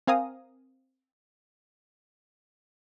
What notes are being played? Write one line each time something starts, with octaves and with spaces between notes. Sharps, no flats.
C4 A#4 F5 G#5 A#5 D#6